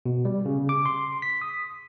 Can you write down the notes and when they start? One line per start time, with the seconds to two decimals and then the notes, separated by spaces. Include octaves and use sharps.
0.06 B2
0.25 G3
0.46 C#3
0.69 D6
0.86 C6
1.22 B6
1.41 D#6